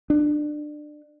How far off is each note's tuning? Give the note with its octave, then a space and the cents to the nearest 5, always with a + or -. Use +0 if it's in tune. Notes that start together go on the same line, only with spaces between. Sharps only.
D4 +25